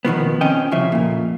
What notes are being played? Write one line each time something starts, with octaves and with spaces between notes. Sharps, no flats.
B2 D#3 F3 B3
C4 C#4 D#5 G5
C2 C#3 F3 E5
F2 A#2